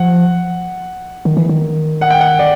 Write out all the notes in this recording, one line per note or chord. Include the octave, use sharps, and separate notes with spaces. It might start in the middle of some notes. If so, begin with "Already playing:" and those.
Already playing: F3 F#5
D#3
E3
D#3
F#5
G5
F#5
D5